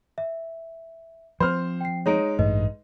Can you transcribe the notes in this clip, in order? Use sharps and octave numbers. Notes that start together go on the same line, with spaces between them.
E5
F3 C4 C5 F6
G5 C7
G#3 D#4 C#5 A#5 D7
A1 G2 A3 B4 D#5